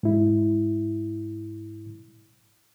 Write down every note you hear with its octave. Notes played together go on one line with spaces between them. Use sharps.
G#2 E4